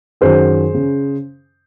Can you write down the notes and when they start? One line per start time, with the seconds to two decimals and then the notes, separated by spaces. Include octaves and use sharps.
0.21 F#2 D#3 F#3 G#4 C5
0.74 C#3